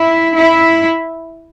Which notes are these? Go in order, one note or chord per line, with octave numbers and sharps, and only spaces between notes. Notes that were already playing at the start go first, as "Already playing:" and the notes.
Already playing: E4
E4